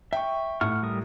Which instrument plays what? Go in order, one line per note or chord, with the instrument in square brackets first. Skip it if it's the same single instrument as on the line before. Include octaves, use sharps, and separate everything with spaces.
[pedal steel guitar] E5 C#6 [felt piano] G5
[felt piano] A2 [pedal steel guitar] F#5 C#6 F6
[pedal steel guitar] G3 A#4 D#6